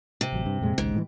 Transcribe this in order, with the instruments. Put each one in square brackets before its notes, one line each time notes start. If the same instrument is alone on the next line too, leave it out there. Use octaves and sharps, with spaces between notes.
[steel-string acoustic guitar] C3
[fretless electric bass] A1 F#3
G2
F2 A#2 G#3
[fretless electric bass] A#1 D#2 C#3 [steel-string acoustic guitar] G#2
[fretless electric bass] A2 C#3 E3